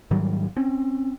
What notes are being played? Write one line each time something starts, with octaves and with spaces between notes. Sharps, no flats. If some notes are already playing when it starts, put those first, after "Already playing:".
G#2 D#3 F#3 G3
C4 C#4